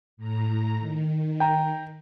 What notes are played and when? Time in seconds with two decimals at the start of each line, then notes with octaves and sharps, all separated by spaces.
0.17 A2 A#5
0.80 D#3
1.40 G5 A#5